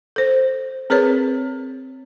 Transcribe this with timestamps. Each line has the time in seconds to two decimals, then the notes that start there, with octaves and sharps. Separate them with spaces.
0.16 A4 C5
0.90 C4 G#4 A#4 B4 C#5